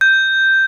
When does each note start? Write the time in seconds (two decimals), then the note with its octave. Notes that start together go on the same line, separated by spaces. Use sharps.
0.01 G6